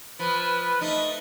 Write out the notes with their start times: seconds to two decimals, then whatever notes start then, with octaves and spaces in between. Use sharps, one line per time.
0.19 F3 B4 B5
0.81 A3 D#4